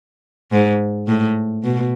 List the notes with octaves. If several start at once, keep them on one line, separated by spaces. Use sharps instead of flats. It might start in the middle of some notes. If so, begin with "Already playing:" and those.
G#2
A2
B2